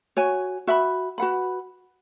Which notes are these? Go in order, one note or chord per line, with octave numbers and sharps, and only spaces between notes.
F#4 C#5 G#5
F#4 E5 B5
F#4 B4 F#5 B5